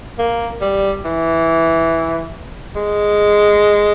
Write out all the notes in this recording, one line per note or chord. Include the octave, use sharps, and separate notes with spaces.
A#3
G3
E3
G#3